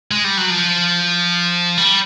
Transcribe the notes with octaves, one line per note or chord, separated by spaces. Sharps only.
G#3
G3
F#3
F3
G3